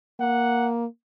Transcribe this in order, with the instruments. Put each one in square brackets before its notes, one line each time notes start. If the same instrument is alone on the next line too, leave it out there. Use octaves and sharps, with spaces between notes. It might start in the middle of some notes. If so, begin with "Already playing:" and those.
[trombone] A#3 [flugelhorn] F#5